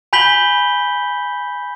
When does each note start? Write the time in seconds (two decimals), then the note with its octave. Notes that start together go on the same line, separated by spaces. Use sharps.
0.13 G#5 B5 G6 B6 F#7 G7